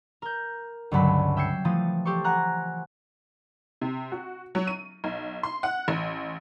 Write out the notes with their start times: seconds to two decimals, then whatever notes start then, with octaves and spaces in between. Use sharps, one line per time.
0.22 A#4 G6
0.91 C#2 G2 D3 F#3 A5 B5
1.36 E5 G5 E6 G#6 C7 C#7
1.65 E3 F3 A3 D#6 A6
2.05 G4 A4 C5 C#6
2.24 F#5 G#5 A#5 F#6
3.81 C3
4.12 F#4
4.55 F#3
4.67 D#7
5.04 B1
5.43 C6
5.63 F#5
5.88 A1